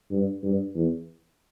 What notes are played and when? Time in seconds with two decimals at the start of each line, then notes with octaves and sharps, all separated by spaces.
0.11 G2
0.43 G2
0.75 E2